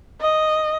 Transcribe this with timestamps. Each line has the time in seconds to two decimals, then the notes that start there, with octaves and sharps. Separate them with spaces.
0.21 D#5